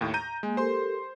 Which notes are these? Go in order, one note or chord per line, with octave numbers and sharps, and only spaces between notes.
D#2 A2
A#5 G6 D#7
G#3 A#3 G#5
G4 A4 A#4 C5 C6